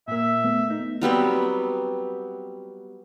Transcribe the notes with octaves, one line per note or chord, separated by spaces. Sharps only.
A#2 A#3 E5
A3 B3
D#4
F#3 G3 B3 C4